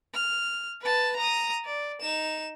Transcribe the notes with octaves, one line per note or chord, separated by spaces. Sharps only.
F6
B4 A5
A#5 D#6
D5
D#4 E7